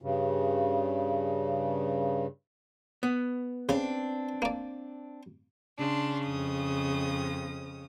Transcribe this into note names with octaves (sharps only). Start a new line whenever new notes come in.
G2 C#3
B3
C#3 C4 D4
A#3 D5
C#3 D4 C6
F2 D#6